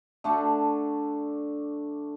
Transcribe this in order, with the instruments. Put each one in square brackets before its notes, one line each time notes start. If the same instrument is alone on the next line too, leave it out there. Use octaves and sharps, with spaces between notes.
[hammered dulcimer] D3 A3 D4 A5